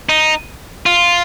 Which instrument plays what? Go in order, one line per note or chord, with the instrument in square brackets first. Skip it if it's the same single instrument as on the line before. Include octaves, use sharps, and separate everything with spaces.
[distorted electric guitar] D#4
F4